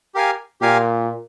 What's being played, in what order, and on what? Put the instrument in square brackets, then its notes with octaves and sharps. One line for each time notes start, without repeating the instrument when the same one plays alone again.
[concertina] G4 A#4 F5 G#5
[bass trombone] A#2 [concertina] G4 A#4 F5 G#5